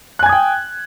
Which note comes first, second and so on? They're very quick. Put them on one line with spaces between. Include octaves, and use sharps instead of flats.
F#6 G#5 G#6 D#6 G5